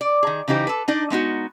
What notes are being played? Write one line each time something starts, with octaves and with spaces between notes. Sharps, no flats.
D5
D#3 G#4
C#3 E3 D#4 G4 C5
A4 B4
D4 D#4 D5
G#3 B3 D#4 F#4